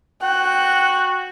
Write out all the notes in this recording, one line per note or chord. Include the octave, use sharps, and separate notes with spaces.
F#4 G5 F#6